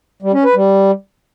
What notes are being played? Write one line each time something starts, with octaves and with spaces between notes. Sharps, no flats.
G3
C#4
B4
G3